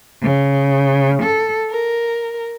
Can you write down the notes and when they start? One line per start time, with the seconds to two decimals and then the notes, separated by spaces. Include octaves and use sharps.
0.22 C#3
1.23 A4
1.70 A#4